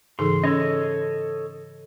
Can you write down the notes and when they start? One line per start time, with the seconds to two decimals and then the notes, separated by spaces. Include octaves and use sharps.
0.19 G#2 C#3 E3 D#4 G#4 A4 C6
0.44 C#4 A4 C#5 D#5